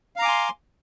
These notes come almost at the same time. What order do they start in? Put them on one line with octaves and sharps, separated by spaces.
F5 A#5 D6 G#5 C6